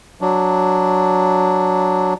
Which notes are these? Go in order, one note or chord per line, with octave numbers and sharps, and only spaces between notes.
F#3 D4